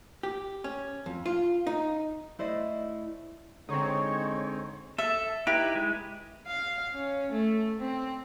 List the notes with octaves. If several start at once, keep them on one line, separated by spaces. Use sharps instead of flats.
G4
C#4
F2
F4
D#4
A3 E4 C5 D5 D#5
D3 G#3 C4 D#4 C#5
A4 E5
D#4 E4 G4 B4
G#3
F5
C#4
A3
C4